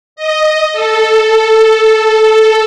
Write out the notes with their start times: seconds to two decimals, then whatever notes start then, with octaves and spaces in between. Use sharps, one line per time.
0.16 D#5
0.73 A4